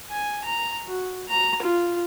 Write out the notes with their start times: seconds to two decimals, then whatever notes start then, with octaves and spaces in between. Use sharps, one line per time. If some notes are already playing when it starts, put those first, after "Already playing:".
0.10 G#5
0.44 A#5
0.86 F#4
1.28 A#5
1.62 F4